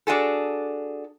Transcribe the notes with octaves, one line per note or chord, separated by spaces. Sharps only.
D4 F#4 G#4 A4